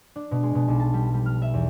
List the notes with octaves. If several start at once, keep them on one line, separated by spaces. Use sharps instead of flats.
D4
B2
G#3
B2
B1
A5
G3
G3
F6
E5
E2